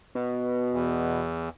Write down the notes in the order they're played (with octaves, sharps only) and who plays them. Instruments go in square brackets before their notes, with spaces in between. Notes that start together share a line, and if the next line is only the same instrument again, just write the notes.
[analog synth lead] B2
[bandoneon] E2